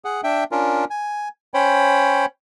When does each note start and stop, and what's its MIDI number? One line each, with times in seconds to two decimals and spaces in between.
0.05 0.21 68
0.05 0.21 78
0.24 0.44 62
0.24 0.44 76
0.24 0.44 79
0.52 0.85 61
0.52 0.85 62
0.52 0.85 65
0.52 0.85 70
0.90 1.29 80
1.54 2.26 61
1.54 2.26 72
1.54 2.26 73
1.54 2.26 79
1.54 2.26 83